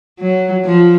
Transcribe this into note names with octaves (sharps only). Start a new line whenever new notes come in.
F#3
F3